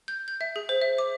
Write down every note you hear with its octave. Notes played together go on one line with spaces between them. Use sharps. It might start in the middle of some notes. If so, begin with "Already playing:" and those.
G6
G6
E5
G#4
C5
E5
D6